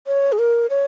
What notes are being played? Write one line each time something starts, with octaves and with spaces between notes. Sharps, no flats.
C#5
G#4
A#4
C#5